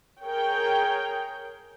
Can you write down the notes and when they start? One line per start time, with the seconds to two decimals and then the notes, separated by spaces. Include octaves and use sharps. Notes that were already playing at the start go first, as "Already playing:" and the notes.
0.22 G#4 A#4 C#5 G5